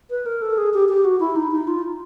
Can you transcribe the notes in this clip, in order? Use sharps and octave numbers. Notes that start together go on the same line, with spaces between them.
B4
A#4
A4
G#4
G4
G4
F#4
E4
D#4
D#4
F4